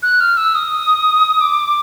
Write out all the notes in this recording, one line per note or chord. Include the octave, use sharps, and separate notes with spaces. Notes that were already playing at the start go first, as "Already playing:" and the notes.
F#6
F6
E6
D#6
D6